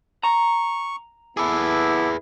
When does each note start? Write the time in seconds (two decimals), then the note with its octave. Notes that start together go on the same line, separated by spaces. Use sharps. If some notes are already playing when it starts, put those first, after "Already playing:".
0.23 A#5 C#6
1.37 B3 E4 G#4 A4 B4 D6